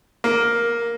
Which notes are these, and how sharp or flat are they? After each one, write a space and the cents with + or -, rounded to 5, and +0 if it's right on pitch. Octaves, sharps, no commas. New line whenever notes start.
A#3 +5